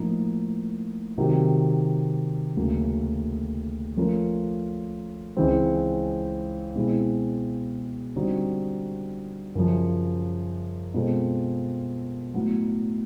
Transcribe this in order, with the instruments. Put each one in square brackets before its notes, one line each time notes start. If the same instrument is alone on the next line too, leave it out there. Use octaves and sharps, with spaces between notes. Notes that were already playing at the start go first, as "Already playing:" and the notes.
Already playing: [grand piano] A2 F3 A#3 D#4
C3 D#3 F#3
D2 C#3 F#3 A#3
F3 A3 C#4 F4 A#4
C#2 C#3 E3 G#3 C4
B2 G#3 C4 E4
D3 G3 C4 D#4 F#4
F#2 C#3 F3
B2 G#3 C4 F4 A4
A2 F#3 B3